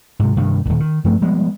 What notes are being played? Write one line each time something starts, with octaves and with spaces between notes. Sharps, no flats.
G#2 C3
G2 C3 D#3
D#1 B1
D#3
G2 F3 A3 C4
F3 G3 G#3 B3